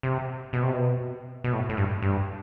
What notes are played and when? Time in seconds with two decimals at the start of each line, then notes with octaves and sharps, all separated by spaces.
0.03 C3
0.53 B2
0.63 C3
0.73 B2
1.44 B2
1.53 A2
1.69 A2
1.77 G2
2.02 G2